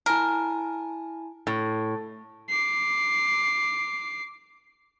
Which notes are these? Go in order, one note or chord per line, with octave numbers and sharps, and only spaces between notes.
E4 A#4 G#5 A5
A2
D6 C7